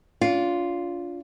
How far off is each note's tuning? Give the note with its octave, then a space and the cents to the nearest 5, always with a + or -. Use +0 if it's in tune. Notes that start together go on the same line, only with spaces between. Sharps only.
D4 -40 F4 +0